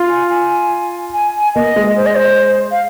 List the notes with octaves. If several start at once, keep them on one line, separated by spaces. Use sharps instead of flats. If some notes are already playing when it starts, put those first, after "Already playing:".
Already playing: F4
G#5
G#5
G#5
G#5
A#3 D#5
G#3
C5
D#5
C5
F5